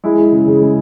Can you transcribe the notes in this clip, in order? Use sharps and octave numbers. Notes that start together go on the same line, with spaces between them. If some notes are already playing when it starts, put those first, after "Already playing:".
G#3 E4
G#3
C#3
C#3
G#3